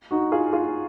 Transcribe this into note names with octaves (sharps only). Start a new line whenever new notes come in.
D#4 F#4
F4 G#4
F4 G#4